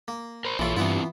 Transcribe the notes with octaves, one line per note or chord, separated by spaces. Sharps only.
A#3
A#4 C5
A#1 E3 E4 F4 A4 C#5
G2 E3 B3 C4 E4 F4